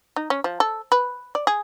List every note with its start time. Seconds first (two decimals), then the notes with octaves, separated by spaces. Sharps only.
0.16 D#4
0.30 C#4
0.44 F3
0.60 A4
0.92 B4
1.35 D5
1.47 G#4